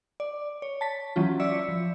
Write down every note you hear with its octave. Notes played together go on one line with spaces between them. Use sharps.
D5
C#5
A5 B6
E3 F#3 C#4 F4
D5 E5 E6 B6 C#7
F3